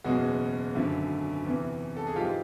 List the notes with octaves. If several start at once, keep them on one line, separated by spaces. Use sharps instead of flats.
F#1 E2 B2 G#3 C#4 F#4 G#4
G#1 F#2 D3
E2 C3 E3
A4
G#4
G#2 E3 G#3 F4 G4